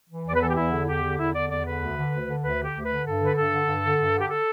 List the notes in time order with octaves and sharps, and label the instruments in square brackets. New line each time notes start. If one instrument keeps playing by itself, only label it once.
[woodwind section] E3
E2 D5
B4
E3 A4
G4
E2 E4
D3
E2 G4
D3
E2 E4
D3 D5
E2 D5
D3 B4
D2
D3
D2
D3
D2 B4
D3
G4
D2
B4
D3
G2 A4
D3 B4
G2 A4
D3
G2
D3
G2
D3
G4
A4